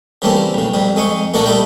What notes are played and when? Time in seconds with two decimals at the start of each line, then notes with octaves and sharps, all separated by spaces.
0.22 C#3 E3 G3 A3 A#3 C4
0.54 B1 C#3
0.74 F2 C3 G3
0.96 F2 G#3 D#4 G#5 C#6
1.34 A#2 A3 D4 F#4 A4 A#4
1.46 G3 A3 D#4 E4 G5